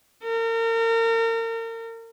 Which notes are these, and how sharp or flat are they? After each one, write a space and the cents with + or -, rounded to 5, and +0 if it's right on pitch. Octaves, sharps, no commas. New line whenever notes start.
A#4 -35